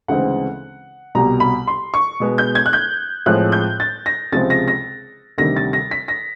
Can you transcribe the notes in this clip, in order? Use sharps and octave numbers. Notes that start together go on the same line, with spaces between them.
D2 C#3 E3 G#3 C4 F#5
C2 B2 G3 A#5
B5
C6
C#6
B2 G#3 B3
G6
G#6
F#6
G6
A2 F3 G#3 C4 F#6
G6
A6
A#6
C#2 C3 F3 G#3 C4 A6
A#6
A#6
D2 C3 D#3 G3 A#6
A6
A#6
B6
A#6